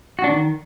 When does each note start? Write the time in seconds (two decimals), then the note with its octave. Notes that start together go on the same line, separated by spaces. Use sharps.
0.19 F#4
0.24 D4
0.29 D#3